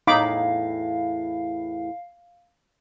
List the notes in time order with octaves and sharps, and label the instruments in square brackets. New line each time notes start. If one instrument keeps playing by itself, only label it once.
[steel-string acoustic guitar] E2 A2 [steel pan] D#4 B5 D6 [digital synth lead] F5